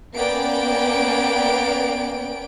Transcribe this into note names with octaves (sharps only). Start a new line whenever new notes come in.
A#3 B3 C#4 D5 G5 D7